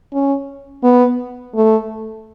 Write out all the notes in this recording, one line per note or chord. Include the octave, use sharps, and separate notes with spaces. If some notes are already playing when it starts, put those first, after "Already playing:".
C#4
B3
A3